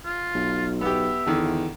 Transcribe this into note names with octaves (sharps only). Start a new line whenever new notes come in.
F4
B1
B3 G4 E5
E2 D3 D#3